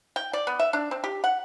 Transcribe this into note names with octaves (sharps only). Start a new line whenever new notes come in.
G5
D5
B3
E5
D4
C4
G4
F#5